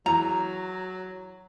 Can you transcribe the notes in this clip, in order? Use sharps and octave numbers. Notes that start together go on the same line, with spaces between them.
E2 E3 F#3 A#5